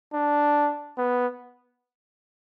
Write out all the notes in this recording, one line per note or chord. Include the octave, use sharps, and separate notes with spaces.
D4
B3